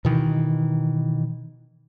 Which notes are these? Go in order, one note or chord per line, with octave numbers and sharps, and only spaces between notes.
B2 D#3 E3